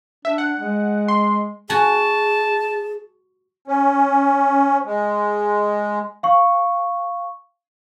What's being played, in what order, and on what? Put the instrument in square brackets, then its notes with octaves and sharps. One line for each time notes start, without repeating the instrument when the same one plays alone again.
[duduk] D4 [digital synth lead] E5
[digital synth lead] F#5
[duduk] G#3
[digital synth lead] C6
[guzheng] F#4 G#5 [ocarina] G#4 [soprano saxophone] A5
[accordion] C#4
G#3
[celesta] F5 C#6